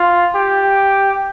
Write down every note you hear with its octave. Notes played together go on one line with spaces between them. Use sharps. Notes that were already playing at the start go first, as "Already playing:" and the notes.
Already playing: F4
G4